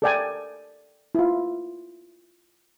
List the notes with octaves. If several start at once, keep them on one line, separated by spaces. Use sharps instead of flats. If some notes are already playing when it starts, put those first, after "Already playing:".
A4 A#4 D5 E5 G5 G#5
E4 F4